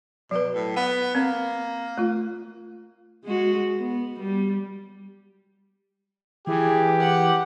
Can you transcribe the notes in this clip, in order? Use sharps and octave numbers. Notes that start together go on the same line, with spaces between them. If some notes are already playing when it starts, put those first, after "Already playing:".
B2 F#3 B4
A2
B3 F#5
A#3 C4
A3 F4
G#3 F#4
B3
G3
E3 G4 G#4
F#5